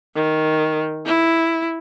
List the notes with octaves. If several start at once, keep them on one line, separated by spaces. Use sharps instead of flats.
D#3
E4